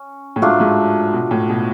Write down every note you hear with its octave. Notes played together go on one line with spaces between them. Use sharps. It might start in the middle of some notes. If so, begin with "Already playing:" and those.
Already playing: C#4
A2
G#2 F#3 A3 D4 F4
G#2
B2
A2
B2